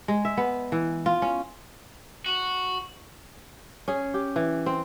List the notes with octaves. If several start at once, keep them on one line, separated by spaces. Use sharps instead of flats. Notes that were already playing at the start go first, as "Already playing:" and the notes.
G#3
E5
B3
E3
F4
C#4
F#4
C#4 G#4
G4
E3
C4